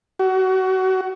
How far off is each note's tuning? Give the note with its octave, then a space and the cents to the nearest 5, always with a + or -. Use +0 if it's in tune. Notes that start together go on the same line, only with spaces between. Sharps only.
F#4 +25